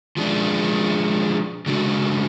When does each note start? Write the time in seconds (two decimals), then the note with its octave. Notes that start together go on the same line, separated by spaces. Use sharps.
0.17 F3 G#3 D4
1.66 C#3 G#3 D4 F#4 A4